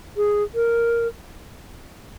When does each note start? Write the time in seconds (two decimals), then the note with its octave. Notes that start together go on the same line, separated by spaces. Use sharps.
0.17 G#4
0.55 A#4